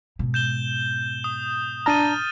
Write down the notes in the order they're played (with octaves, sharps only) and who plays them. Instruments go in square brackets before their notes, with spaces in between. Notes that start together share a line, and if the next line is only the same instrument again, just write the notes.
[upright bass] G#2 B2
[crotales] G6 E7 G7
D#6
[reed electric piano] D4 A5 A#5 [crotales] F6 A6 D#7